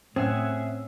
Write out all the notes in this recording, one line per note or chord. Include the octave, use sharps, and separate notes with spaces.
A2 C4 C#4 G#4 E5 F#5